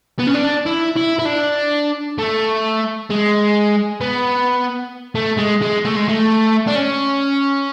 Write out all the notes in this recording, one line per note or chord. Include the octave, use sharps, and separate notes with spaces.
B3
C#4
D4
E4
E4
E4
D4
A3
G#3
B3
A3
G#3
G#3
A3
G#3
A3
D4
C#4